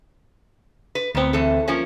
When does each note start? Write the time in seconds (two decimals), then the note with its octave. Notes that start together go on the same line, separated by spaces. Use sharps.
0.95 B4
1.15 D2 A#2 B3 C4
1.33 E2 E3 A4
1.68 F3 A#3 C#4